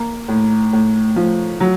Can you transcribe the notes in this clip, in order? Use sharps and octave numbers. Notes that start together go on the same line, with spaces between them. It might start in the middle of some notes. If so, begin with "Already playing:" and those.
Already playing: A#3
A2
A2
F3
F#3